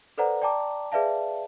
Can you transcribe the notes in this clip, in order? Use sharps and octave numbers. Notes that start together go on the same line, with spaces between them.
A4 B4 C5 D5 F#5 A#5
D5 G5 A5 A#5 D6
G#4 B4 D5 E5 F5 A5